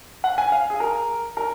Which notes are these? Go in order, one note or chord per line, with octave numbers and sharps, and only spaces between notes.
F#5
G#5
F5
G#4
A#4
A#4